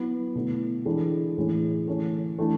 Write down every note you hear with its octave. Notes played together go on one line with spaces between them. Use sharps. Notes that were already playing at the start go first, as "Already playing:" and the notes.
Already playing: F#3 B3 E4 B4
B2 A3 E4
E3 G#3 D4 A4
A2 E3 G#3 C#4
E3 A3 C#4
E3 A3 D4